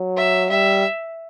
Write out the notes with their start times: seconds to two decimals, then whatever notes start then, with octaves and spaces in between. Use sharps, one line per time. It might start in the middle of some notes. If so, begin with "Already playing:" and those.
Already playing: F#3
0.17 E5
0.50 G3 E5